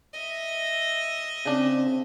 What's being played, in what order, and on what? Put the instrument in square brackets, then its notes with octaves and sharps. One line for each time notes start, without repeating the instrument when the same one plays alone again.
[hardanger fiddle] D#5 E5
[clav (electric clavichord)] C#3 D4 [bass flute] C4